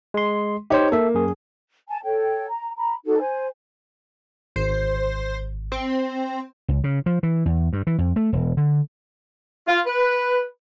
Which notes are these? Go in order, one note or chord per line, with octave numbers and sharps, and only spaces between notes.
G#3 C6
D#4 G4 C5 C#5
A#3 A4 E5
F#2 G#4
G#5 A5
A4 C#5 G5
A#5
A#5 B5
D#4 F#4 A4
C5 G#5
G#1 C5
C4
C#2
C#3
F3
E3
E2
G2
E3
F2
A3
E1
D3
F4
B4